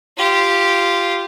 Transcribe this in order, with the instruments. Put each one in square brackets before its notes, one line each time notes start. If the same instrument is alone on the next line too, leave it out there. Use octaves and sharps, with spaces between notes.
[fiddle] F4 G4